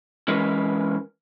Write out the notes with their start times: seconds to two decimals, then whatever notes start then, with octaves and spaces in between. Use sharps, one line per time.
0.28 E3 G#3 C#4 A#4 B4